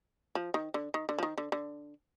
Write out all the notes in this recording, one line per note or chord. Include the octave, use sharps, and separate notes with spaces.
F3
D#3
D3
D#3
D3
F3
D#3
D3
D3